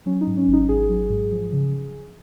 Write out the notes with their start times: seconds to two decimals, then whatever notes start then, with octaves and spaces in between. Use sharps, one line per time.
0.06 F#3 C#4
0.21 D#4
0.27 G#2
0.37 C#4
0.47 G#1
0.53 D#4
0.69 G#1 G#4
0.89 F#3
1.10 G#2
1.32 F3
1.52 C#3